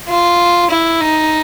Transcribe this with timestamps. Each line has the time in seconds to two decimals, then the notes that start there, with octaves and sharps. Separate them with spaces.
0.08 F4
0.70 E4
1.01 D#4